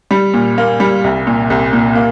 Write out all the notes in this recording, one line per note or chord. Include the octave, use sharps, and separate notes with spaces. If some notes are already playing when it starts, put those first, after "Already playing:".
G3
A#2
A#3
G3
C2
A#2
C2
A#2
A#3